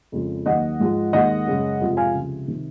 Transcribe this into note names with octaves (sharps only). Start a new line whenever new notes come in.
F2 C#3 F3 G#3
D#2 D#3 F#3 D#5 F#5
G#2 F3 G#3
D#2 D#3 G#3 D#5 F#5
F#2 C#3 G#3
F2 C3 F3 G#3
F5 G#5
C#2 C3 F3
C3 D#3